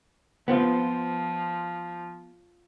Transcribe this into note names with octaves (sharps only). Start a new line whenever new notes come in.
F3 B3 C4 F4